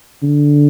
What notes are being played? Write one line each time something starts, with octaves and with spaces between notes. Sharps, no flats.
D3